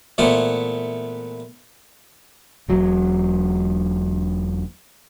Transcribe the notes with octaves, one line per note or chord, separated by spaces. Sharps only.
A#2 E3 A3 B3 C5 D6
E1 F#3